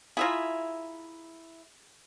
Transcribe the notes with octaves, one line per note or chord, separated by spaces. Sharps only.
E4 F4 G#4 E5 A#5